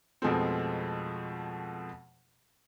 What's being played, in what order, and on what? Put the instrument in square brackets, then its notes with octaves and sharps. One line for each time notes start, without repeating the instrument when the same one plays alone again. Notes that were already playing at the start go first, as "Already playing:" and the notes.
[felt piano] F2 B2 F3 G#3 A3 C4